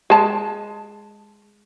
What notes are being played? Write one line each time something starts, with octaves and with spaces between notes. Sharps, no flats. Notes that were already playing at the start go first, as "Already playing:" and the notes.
G#3 A5